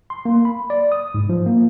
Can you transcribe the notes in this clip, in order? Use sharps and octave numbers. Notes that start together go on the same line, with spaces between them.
C6
A#3
B5
D5
D#6
G#2
F3
A#3